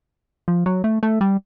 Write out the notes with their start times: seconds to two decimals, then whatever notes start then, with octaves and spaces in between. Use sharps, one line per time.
0.48 F3
0.66 F#3
0.84 A3
1.03 A3
1.21 G3